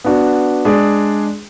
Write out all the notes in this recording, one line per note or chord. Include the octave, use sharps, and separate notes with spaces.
B3 D4 F#4
G#3 D4 G#4 D5